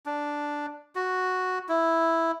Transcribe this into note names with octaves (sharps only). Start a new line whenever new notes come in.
D4
F#4
E4